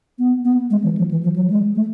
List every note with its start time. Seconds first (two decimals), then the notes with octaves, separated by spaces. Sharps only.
0.19 B3
0.45 B3
0.71 G#3
0.84 E3
0.97 F3
1.11 E3
1.23 F3
1.36 F#3
1.50 G#3
1.75 A3